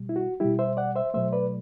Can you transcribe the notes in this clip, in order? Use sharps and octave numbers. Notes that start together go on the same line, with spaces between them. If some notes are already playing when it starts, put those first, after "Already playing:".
Already playing: B2 G3
E4
F#4
B2 G3 E4 G4
C5 E5
D5 F#5
C5 E5
B2 F#3 A3 C5 E5
B4 D5